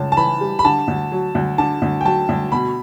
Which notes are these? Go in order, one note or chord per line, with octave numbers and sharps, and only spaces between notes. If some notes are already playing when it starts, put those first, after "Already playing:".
Already playing: C#2 A5
A5
E3 B5
G3
B5
D3 A5
D2
F#3
D2
D3 A5
D2
G5
F#3 A5
D2
B2 B5